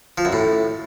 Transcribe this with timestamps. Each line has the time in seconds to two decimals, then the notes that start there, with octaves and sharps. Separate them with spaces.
0.18 F3
0.25 F#2
0.33 A2